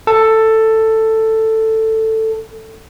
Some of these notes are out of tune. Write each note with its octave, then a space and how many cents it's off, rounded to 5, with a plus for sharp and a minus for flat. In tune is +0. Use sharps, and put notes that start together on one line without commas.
A4 +10